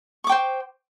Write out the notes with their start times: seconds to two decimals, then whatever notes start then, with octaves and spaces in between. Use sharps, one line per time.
0.24 C#6
0.27 D6
0.29 G5
0.32 C5